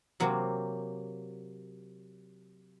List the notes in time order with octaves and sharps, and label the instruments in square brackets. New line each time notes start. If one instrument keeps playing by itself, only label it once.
[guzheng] C3 F#3 A#3 C4